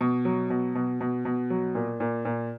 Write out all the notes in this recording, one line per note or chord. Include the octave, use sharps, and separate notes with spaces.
B2
F#3
B2
B2
B2
B2
F#3
A#2
A#2
A#2